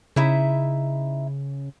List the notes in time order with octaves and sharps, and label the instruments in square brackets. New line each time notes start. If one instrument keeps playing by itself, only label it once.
[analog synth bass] C#3 [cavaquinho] D#4 E4 E5